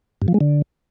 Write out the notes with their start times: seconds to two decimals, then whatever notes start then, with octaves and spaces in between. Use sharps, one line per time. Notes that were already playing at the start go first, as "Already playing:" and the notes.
0.22 G2
0.28 F3
0.34 G#3
0.41 D3